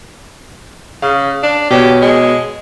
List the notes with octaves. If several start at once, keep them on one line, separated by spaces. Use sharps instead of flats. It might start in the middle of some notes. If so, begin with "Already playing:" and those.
C#3 F5
D4
B2 G4 C#5
G#3